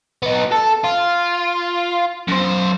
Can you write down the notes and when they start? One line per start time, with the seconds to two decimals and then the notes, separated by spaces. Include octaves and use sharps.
0.23 B3 D#4
0.52 A4
0.84 F4
2.28 F#2 C5